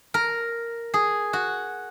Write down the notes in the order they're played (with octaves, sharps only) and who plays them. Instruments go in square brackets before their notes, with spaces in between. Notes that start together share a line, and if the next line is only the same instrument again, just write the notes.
[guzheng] A#4
G#4
F#4